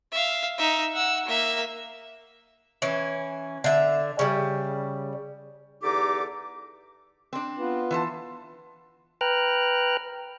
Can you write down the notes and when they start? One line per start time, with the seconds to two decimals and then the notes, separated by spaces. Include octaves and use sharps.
0.12 E5 F5
0.58 D#4 E5
0.94 F#5 E6
1.26 A#3 E5
2.82 E3 C#4
3.64 D3 E5
4.19 C#3 G3
5.83 E2 D3 D#4 G4 A4 D6
7.33 C4 D4
7.59 B3 F4 B4
7.91 E3 C5 A5
9.21 B4 G5 A#5 F6 F#6